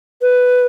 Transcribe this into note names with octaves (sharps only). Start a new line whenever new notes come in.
B4